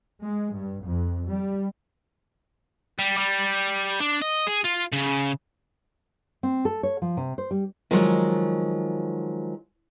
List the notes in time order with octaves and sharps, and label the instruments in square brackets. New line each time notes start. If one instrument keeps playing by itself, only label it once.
[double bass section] G#3
G2
F2
G3
[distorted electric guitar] G3
G3
D4
D#5
G#4
F4
C#3
[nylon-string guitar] C4
A4
C#5
F3
C3
C5
G3
[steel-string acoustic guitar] D#3 F3 F#3 G#3